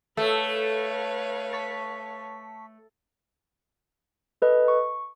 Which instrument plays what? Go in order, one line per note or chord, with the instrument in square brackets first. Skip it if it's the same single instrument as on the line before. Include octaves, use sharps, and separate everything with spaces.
[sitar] A3 [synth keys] A4 [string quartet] B4 C#5 F5
[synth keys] A5 C#6 B6
[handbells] A4 B4 D#5
C#6